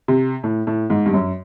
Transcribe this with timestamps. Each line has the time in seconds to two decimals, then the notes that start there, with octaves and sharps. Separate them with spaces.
0.08 C3
0.44 A2
0.67 A2
0.90 G#2
1.06 G2
1.13 F#2